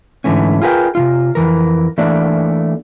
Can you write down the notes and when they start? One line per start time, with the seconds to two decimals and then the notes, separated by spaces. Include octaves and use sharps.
0.24 G#2 D3 E3 A3 C#4
0.62 F4 G#4 A#4 B4 F5 G5
0.95 C3 D#3 F4
1.35 F2 E3 A#4
1.98 E3 A3 A#3 D4 F#4 D5